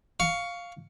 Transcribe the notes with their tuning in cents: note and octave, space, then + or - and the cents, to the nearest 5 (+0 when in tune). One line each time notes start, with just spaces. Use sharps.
F5 +0 C#6 +15